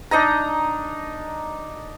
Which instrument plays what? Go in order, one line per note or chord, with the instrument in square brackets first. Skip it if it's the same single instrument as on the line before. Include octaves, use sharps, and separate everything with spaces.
[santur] D4 D#4 D#5 A#5